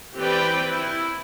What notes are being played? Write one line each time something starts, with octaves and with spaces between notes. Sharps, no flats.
E3 C4 G4 B4 D5 G5
E4